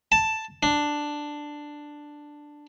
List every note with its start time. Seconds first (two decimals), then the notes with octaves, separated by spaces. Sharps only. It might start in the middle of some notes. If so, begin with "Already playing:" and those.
0.12 A5
0.63 D4